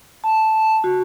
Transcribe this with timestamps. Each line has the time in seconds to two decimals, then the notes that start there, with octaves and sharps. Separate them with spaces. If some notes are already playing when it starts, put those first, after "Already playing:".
0.24 A5
0.84 F#4